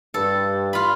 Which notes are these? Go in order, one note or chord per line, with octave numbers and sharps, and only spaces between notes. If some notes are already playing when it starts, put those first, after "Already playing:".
G2 A4
F4 B5